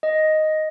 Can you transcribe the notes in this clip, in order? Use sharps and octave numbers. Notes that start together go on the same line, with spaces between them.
D#5